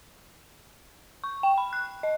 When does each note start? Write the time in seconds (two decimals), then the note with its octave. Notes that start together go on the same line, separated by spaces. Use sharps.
1.24 C#6
1.43 G5
1.58 B5
1.73 F#6
2.03 D#5